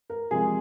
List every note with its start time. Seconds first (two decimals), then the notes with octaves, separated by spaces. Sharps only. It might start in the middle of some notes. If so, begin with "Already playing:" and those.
0.10 A#4
0.31 C3 F3 G#3 G#4